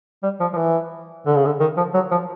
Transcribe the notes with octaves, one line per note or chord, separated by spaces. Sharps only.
G3
F3
F3
E3
D3
C#3
D3
D#3
F3
F#3
F3